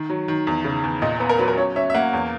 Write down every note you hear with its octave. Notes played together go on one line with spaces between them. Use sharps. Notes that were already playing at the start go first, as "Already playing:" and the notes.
Already playing: D#3
F#3
D#3
E2
C#3
E2
A#2 D#5
B3
A#4
F#3 B4
A#4
C#4 C#5
C#4 E5
E5
A#3 F#5
E2